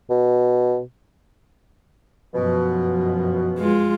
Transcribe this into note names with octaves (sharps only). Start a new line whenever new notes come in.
B2
F#2 B2 F3
G#3 F4